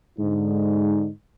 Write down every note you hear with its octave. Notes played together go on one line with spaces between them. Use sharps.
G#2 D3 D#4